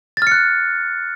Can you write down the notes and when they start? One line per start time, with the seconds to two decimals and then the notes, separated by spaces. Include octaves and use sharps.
0.17 A6
0.22 F6
0.27 C#7
0.32 F#6